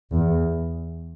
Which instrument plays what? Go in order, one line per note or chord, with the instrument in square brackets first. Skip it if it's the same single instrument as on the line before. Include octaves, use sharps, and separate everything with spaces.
[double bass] E2